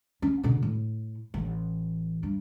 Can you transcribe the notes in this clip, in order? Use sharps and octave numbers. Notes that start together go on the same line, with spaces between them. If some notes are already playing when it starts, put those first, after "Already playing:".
C#4
B2 D3
A2
A1
G2